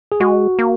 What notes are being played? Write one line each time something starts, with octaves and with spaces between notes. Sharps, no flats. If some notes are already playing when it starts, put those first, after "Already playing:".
G#4
G#3 F#4
A#3